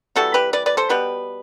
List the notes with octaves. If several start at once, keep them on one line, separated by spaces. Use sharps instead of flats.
C3 E3 G3 F#4 A4
G4 B4
B4 D5
B4 D5
A4 C5
B2 G3 B3 G4 B4